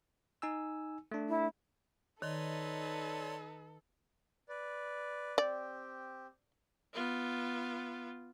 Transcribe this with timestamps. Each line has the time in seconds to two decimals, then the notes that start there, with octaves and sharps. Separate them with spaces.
0.42 D#4 G#5 E6
1.12 A3 D4
1.29 E4
2.22 D#3 D#4 A4 B4 C#5 D5 C6
4.49 B4 D5
5.38 C4 G4 D5
6.93 B3 F4